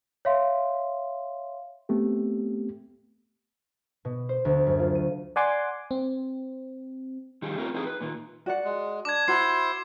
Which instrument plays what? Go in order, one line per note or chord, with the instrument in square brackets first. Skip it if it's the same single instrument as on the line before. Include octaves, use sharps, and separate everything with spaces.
[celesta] C#5 E5 F5 C6
[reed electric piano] A3 B3 C4 G4
[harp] B2
C5
D2
F#2
F4
D#7
[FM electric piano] D5 F#5 G#5 C6 D6
C4
[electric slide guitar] D#3 G3 G4 G#4
A3 C4 F4 A#4
C4 D#4 E4 G4 G#4 B4
B4
A#2 D#3
[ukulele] F#4 D5 F#5
[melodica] G#3
[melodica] D4 [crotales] D6 G#6
[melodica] E4 C5 C6 [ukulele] F#4 B5 [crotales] C7